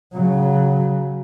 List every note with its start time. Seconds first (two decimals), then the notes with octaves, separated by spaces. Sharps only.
0.13 C#3 F#3